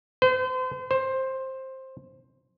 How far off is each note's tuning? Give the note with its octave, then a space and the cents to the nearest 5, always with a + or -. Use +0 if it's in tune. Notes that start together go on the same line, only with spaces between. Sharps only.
C5 -40
C5 +10